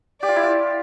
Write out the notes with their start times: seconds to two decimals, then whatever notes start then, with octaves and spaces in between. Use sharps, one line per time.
0.21 G4 D5
0.29 F4
0.36 E4
0.43 F4